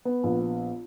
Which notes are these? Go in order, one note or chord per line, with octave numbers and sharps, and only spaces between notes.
B3
A#1
B3